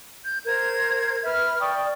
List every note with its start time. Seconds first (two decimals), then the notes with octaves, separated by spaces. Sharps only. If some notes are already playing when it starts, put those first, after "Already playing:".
0.22 G6
0.46 A#4 C5 G#6
1.23 B4 E5 F6
1.60 D5 G5 C#6 D#6